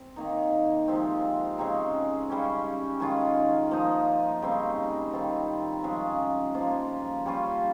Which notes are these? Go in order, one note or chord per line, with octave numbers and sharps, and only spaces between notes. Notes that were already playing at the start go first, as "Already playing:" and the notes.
Already playing: C4
D#3 A#3 D#4
C3 F3 G#3 C4
C#3 G#3 C4 D#4
C#3 G3 C#4
D#3 G#3 C#4 F4
F3 A#3 D#4
C#3 G3 C4 D#4
D#3 G3 C4 F4
C#3 F3 G#3
F3 A#3 F4
G3 C#4 F4